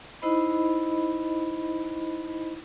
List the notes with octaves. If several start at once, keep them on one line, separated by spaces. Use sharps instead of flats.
D#4 E4 C5 D#5 B5